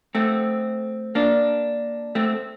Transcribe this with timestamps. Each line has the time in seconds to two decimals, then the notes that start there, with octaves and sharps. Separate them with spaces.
0.15 A3 C4
1.15 A#3 D4
2.15 A3 C4